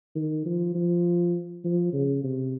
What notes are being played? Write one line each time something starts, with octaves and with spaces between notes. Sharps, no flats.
D#3
F3
F3
F3
C#3
C3